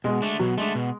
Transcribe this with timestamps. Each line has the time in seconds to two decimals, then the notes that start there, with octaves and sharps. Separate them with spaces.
0.04 B2 G#3
0.22 A3 D4
0.39 B2 F#3
0.57 G#3 A3 D4
0.75 B2